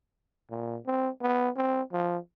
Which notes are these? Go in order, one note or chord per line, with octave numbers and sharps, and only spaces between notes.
A#2
C4
B3
C4
F3